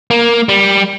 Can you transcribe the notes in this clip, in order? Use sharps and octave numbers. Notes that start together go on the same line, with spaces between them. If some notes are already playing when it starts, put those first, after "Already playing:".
A#3
G3